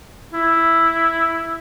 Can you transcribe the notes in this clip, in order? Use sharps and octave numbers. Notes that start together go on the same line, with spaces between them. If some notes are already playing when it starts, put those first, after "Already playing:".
E4